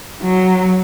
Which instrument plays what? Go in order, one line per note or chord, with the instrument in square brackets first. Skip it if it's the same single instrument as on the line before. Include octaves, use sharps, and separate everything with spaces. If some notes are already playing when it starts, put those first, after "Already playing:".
[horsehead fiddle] F#3